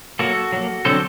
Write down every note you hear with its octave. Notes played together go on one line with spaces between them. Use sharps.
F#3 A#3 F#4 A4
F#3 A#3
D3 F#3 C4 A4 C5